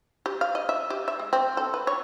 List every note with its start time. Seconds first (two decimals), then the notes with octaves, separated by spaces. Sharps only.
0.26 G4
0.41 F5
0.55 D#5
0.69 E5
0.90 G4
1.08 E5
1.19 G#3
1.33 C4
1.57 A4
1.74 B4
1.87 C#5